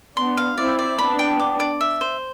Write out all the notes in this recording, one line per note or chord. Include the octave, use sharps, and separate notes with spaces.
B3 D4 C6
F5
C4 E4 D5
D5
B3 D4 B5
G5
D6
D5
E5
C5